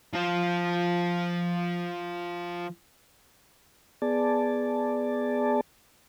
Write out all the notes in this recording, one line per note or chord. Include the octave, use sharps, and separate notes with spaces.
F3 F4
B3 G#4 D5 A5